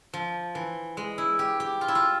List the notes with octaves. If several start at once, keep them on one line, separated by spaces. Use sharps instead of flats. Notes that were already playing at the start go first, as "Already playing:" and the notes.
F3
E3
G#3
E4
G4
G4
F4
E4
F4